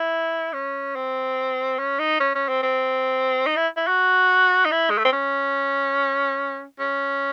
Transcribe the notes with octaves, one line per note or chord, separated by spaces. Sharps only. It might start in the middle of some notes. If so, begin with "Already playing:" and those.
Already playing: E4
C#4
C4
C#4
D#4
C#4
C#4
C4
C4
D#4
E4
E4
F#4
D#4
E4
G#3
A3
C4
C#4
C#4